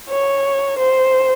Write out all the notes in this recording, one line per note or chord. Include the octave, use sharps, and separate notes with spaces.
C#5
C5